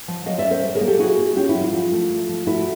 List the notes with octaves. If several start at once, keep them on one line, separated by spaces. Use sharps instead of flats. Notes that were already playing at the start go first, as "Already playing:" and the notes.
F3
F#3 D#5 F5
D5 E5
C#4
A#4 C5
F#3
G#4 A#4
A#3
G4 A4
E4 F#4 G#4
A#3
C#4 F4 G4
E4
F#3
F4
F3
A3
A3
F3
A3 E4 F#4